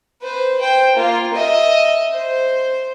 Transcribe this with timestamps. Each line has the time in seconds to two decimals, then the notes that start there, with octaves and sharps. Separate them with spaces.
0.22 B4 C5
0.60 C5 G5
0.96 A#3 F4
1.34 D#5 E5
2.13 C5